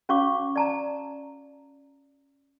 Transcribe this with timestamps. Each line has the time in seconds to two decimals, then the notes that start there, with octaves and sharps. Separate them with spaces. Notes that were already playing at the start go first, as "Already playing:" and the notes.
0.09 C#4 F#4 C#5 F5 C#6 D6
0.56 D5 A5 A#5